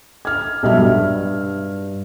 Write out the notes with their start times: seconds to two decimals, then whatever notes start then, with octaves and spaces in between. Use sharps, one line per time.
0.25 F6 G#6
0.63 B1 G3 E5 F6
0.77 G2